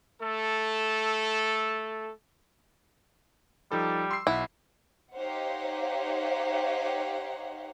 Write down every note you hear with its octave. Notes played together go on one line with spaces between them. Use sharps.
A3 A4
F3 G3 D#4 A4
C6 E6 C7
B1 E4 F#5
D#4 G4 C5 C#5 F5 F#5